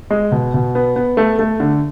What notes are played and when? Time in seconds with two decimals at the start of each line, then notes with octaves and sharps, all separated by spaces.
0.11 G#3
0.32 B2
0.54 B2
0.75 B3
0.96 B3
1.17 A3
1.39 A3
1.60 D3